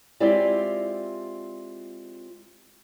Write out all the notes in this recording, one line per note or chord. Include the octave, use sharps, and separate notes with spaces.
G#3 C4 E4 F4 G4 D5